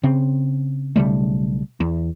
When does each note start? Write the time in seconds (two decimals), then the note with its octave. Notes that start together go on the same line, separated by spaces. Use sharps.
0.03 C#3 C4
0.96 B1 C#3 G3 A3
1.80 E2